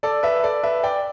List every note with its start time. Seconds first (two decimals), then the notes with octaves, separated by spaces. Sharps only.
0.03 A4 D5
0.23 B4 E5
0.43 A4 D5
0.63 B4 E5
0.83 D5 G5